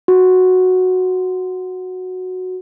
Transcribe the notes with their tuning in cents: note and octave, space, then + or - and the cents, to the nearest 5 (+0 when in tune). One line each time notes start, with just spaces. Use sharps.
F#4 -5